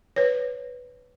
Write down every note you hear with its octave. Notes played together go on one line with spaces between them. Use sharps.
B4 C#5